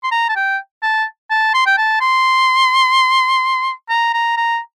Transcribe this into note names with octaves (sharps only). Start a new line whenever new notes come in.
C6
A#5
A5
G5
A5
A5
C6
G5
A5
C6
A#5
A#5
A#5